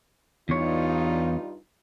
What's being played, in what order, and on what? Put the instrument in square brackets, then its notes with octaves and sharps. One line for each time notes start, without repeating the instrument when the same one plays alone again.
[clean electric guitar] E2 C#5 [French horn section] G2 D#4 F4